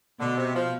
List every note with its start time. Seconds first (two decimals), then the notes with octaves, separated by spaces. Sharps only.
0.19 B2 D3
0.37 C3
0.54 F3